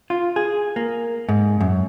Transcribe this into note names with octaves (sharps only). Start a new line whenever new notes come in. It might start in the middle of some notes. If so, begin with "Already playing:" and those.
F4
G#4
A#3
G#2
F#2